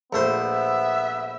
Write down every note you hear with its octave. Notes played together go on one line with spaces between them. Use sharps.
A#1 A3 B3 C5
E5